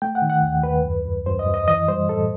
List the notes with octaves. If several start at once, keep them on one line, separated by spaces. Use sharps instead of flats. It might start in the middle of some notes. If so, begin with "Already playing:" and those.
A3 G5
F#5
D#3
F#5
D#2
D#2 B4
F#2
F#2
F#2 C5
D#5
F#2
D#5
E3 D#5
G3 C5
A2 A4